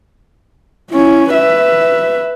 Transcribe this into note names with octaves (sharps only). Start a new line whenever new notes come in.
C#4 E4
B4 E5